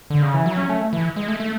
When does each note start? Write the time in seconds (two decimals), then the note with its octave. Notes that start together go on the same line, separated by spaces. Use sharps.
0.10 D3
0.22 C#3
0.34 E3
0.46 F#3
0.57 C#4
0.69 A3
0.93 E3
1.16 G#3
1.28 A3
1.40 A3